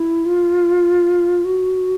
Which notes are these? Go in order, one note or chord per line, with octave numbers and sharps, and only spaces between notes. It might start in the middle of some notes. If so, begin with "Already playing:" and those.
Already playing: E4
F4
F#4